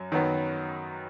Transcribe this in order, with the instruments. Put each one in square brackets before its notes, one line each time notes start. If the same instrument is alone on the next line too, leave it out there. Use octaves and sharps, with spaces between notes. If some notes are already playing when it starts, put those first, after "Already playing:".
Already playing: [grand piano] F#2 F#3
F#2 D#3 F#3 B3